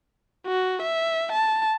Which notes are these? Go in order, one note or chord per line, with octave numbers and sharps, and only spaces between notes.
F#4
E5
A5